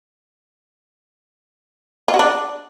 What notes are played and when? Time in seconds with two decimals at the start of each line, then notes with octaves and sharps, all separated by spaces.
2.08 F4
2.14 F#4
2.19 D4